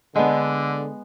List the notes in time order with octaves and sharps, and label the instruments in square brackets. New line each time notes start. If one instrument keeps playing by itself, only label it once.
[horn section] D3 [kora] G#3 B3